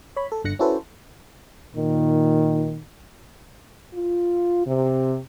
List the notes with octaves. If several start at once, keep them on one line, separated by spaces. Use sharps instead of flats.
C#5 B5
A4
G1 D3 F#6 A#6 C#7
C#4 E4 F#4 A4 B4 C5
A#2 D#3
F4
C3